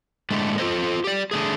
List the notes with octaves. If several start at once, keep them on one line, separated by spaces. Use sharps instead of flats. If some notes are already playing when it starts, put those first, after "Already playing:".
A2 D3 G#3 A3
F4 A4 C5 D#5
G4 D5
D3 A3 G#4